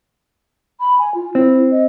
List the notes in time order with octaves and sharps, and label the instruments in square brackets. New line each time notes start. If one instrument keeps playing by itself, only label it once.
[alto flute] B5
G#5
F4
[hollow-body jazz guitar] C4 [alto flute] E4
[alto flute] D#5